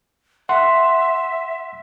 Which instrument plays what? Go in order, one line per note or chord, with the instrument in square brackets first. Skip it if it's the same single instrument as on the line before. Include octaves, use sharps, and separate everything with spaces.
[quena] E5 [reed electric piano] F#5 C6